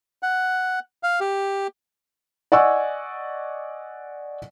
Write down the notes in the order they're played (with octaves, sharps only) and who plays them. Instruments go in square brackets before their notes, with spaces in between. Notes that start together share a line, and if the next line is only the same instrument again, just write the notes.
[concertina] F#5
F5
G4
[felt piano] D5 D#5 F#5 G#5 C#6 E6